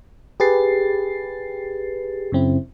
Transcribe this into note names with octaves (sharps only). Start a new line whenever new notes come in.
G4 G#4 B4 A6 C7
F#2 C#3 C4 E4